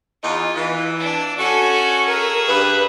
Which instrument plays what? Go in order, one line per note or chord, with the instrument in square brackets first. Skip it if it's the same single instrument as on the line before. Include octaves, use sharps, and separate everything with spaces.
[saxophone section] E2 D#4 [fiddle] F4
[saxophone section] E3
[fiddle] D4
[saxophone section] C#4 F#4 [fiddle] A4 G#5
[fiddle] G#4 E5 [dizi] A#4
[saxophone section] G2 [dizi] B4